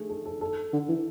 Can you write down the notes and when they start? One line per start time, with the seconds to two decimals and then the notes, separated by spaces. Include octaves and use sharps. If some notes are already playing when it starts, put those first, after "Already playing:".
Already playing: A3 G#4
0.09 A4
0.26 A4
0.41 A4
0.73 D3
0.89 E3